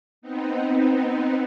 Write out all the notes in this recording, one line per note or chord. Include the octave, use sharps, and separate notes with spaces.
B3 C4 D#4